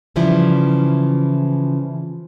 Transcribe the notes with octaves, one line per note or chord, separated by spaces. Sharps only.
C#3 E3 F3 G3 E4